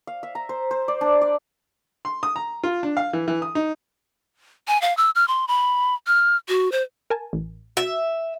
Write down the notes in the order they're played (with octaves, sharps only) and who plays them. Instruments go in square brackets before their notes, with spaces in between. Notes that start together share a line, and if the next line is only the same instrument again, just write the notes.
[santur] F5
E5
A#5
C5
C5
D5
D4
D5
[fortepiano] C6
D#6
A#5
F4
D4
F5
E3
E3
D#6
D#4
[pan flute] G#5
F5
E6
F6
C6
B5
F6
F#4
C5
[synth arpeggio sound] A#4 G#5 A5
A1
[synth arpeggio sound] F#4 [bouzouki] E5